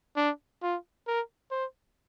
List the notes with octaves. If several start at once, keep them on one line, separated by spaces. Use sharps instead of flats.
D4
F4
A#4
C5